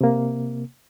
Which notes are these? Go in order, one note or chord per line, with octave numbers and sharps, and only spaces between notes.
C3 A#3